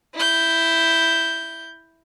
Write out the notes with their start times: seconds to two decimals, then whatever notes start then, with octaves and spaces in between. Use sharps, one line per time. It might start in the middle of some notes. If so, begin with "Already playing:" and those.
0.15 E4 G6